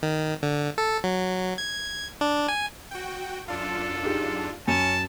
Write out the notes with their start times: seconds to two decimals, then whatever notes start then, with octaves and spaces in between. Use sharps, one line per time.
0.03 D#3
0.43 D3
0.78 A4
1.04 F#3
1.58 G#6
2.21 D4
2.49 G#5
2.91 F#4 G5
3.48 F#2 D4 F4 A4
4.03 D#4 G4 G#4
4.68 F#2 C#4 A5